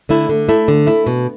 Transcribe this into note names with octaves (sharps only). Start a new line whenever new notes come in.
D3 A3 E4
D3
A3 E4
D3
A3 E4
B2